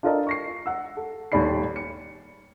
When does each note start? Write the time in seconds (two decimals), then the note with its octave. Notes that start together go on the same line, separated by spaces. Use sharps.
0.03 D4 F4 A4 A#4 D5 D#5
0.27 C#6 A#6 C7
0.66 F#5 E6
0.97 A4
1.32 D#1 D#2 D#3 D5 B5 C7
1.76 C#7